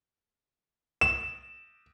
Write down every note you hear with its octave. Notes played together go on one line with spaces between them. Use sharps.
E7